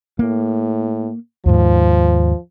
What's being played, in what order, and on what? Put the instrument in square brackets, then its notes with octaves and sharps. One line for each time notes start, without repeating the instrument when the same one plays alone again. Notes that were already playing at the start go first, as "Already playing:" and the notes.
[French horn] A2 [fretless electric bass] A#3
[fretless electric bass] D#2 G#2 [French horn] F3